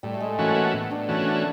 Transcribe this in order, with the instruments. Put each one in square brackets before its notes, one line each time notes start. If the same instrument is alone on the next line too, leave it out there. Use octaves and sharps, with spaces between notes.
[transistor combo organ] A2 [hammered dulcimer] G3
[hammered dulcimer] A3
G#3
[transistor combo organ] E3 A3 C#4 F#4 [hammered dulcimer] A#3
[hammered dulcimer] B3
[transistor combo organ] A2
[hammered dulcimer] D4
[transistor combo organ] E3 A3 C#4 F#4
[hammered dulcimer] D4